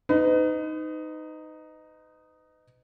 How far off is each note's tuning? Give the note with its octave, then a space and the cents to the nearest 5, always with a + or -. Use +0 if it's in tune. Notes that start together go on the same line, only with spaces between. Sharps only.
D#4 +0 B4 +40